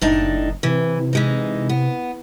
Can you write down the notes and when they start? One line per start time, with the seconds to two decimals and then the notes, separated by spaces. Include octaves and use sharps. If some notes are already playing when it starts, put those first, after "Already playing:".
0.01 F#1 A2 D4 D#4
0.63 C3 E3
1.13 E3 G#3 D#4
1.69 B3